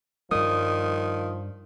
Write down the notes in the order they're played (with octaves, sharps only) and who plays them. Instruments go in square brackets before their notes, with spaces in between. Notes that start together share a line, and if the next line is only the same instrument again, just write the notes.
[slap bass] G2 G3 [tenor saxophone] D#3 [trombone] F3 [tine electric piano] D#6